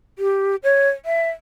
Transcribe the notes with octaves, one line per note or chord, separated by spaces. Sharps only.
G4
C#5
E5